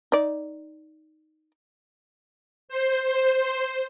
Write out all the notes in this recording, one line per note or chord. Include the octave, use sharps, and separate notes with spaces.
D#4 D5
C5